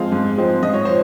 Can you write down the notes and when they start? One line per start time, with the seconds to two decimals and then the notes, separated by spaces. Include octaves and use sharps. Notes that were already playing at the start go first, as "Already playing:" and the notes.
Already playing: F3 G#3 C4 F5
0.12 G#2
0.38 F3 G#3 C4
0.63 G#2 D#5
0.74 C#5
0.85 F3 C5